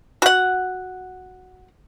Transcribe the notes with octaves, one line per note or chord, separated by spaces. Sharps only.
F#4 F#5